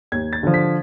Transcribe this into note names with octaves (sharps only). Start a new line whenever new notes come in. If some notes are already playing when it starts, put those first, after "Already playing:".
D#2 G#6
A6
D3 F3
B6